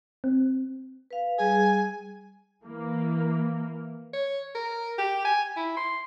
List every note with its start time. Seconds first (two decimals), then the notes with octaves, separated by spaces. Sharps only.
0.24 C4
1.11 B4 F5
1.38 G3 G#4 G#5
2.64 E3 A#3
4.13 C#5
4.55 A#4
4.98 G4
5.25 G#5
5.57 E4
5.77 C6